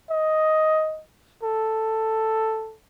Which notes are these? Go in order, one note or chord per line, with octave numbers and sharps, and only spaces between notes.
D#5
A4